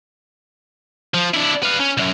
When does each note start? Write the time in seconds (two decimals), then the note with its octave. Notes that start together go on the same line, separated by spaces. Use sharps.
1.14 F3
1.34 D4 E4
1.63 B4 F5
1.80 C#4
1.97 B1 F#2